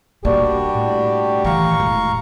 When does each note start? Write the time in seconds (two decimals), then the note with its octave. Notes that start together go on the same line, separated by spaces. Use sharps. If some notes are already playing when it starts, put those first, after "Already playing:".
0.25 B2 G3 A#3 D4 F#4 G4 D5
0.74 A2
1.45 D#3 E3 F5 A#5 C#6
1.80 E1 A2